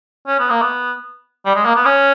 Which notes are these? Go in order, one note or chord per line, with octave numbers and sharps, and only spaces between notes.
C#4
B3
A#3
B3
G3
G#3
A#3
B3
C#4